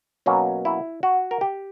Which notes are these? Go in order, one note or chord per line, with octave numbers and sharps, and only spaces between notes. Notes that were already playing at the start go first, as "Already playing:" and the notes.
B2 F#3 A#3 C#4
E4
F#4
A#4
G4